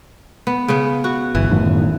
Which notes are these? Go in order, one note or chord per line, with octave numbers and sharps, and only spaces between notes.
B3
C#3 B3
F#4
G1 E3
F#2 A2 D#3